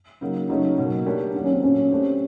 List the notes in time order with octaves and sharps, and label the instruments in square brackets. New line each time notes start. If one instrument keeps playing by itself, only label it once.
[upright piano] C#3 F#3 A#3 D#4
[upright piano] C#3 F#3 A3 C#4 [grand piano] D#4
[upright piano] B2 F#3 A#3
A3 D4 G4 A#4 C#5
[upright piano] D#3 F#3 A#3 [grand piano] D4
[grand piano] C#4
C4
[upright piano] A#2 F#3 A3 [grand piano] C#4
[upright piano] A3 D4 G4 C5